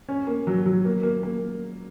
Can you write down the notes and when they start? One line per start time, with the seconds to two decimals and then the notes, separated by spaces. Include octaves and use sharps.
0.09 C#4
0.27 A#3
0.47 F#3
0.66 F#3
0.85 A#3
1.03 A#3
1.23 A#3